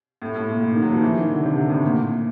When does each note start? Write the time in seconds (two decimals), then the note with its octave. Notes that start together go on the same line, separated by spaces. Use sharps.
0.22 A2
0.35 A2
0.48 A#2
0.61 A#2
0.72 D#3
0.82 F#3
0.92 F3
1.02 E3
1.16 D#3
1.30 D3
1.43 C3
1.57 D3
1.70 A2
1.84 A#2